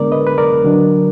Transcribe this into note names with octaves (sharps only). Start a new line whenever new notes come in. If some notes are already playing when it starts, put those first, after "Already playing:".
Already playing: D3 G#3 B3 D4 A#4 D5
B4 D#5
B4
A#4 D5
D3 F#3 D4